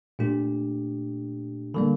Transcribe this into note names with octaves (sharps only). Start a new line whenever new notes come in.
A#2 A3 D4 G4
D3 G3 A#3